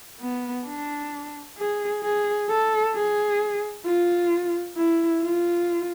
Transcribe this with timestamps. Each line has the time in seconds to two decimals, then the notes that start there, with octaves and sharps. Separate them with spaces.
0.21 B3
0.66 D4
1.58 G#4
2.03 G#4
2.50 A4
2.95 G#4
3.86 F4
4.77 E4
5.23 F4